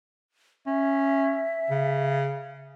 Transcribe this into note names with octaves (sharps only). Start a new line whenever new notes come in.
C#4 E5
C#3